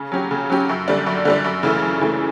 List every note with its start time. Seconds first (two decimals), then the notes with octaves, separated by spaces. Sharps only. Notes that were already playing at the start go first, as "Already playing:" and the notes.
Already playing: C#3
0.12 F#3 C#4 G4
0.31 C#3
0.50 F#3 C#4 G4
0.69 F#2
0.88 D3 G3 D4
1.06 F#2
1.25 D3 G3 D4
1.44 F#2
1.63 C#3 E3 A3
1.83 F#2
2.01 C#3 E3 A3